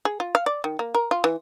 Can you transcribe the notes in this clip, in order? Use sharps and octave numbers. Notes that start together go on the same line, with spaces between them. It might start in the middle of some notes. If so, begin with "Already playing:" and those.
G#4
F4
F5
D5
D#3
A#3
A#4
F4
E3